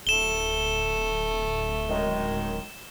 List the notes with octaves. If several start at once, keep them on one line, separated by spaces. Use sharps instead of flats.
D1 A3 E7 G7
F#2 D#3 G#3